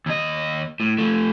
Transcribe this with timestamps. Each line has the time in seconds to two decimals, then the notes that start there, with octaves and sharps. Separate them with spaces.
0.06 D#2 D#5
0.80 A2
0.98 F3 A3